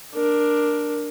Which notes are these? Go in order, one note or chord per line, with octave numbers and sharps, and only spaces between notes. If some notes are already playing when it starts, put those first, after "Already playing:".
D4 A#4